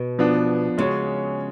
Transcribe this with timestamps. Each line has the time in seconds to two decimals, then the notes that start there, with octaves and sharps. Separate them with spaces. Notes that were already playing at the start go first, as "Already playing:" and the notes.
Already playing: B2
0.19 F3 B3 D4
0.78 C#3 G#3 C#4 F#4 C#5